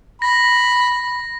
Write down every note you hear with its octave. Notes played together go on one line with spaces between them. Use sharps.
B5 A#6